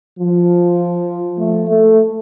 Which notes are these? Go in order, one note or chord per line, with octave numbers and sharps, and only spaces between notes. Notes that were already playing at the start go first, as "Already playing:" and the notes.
F3
A3
A3